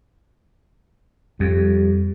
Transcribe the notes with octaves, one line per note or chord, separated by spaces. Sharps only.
F2 G3